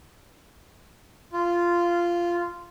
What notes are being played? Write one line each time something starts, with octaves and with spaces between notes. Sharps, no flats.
F4